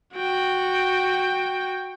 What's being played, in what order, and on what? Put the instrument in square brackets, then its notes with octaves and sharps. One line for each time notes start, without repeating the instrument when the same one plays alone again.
[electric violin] F#4 G5